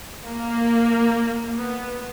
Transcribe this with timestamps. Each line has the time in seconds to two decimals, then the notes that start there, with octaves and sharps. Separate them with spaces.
0.24 A#3
1.56 B3